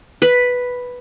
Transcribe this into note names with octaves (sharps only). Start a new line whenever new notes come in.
B4